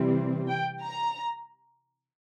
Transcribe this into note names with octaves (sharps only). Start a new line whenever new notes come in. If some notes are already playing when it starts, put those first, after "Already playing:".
Already playing: C3 E3 G3 C4
G5
A#5